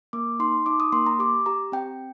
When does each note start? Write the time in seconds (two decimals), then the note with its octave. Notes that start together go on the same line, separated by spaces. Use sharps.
0.13 A#3 D6
0.40 D#4 C6
0.66 D#4 D6
0.80 D#6
0.93 A#3 C6
1.06 A#5
1.19 G4 D6
1.46 G4 A#5
1.72 C4 G5